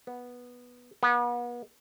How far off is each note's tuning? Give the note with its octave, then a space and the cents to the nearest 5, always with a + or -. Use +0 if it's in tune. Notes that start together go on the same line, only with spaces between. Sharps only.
B3 -10
B3 -40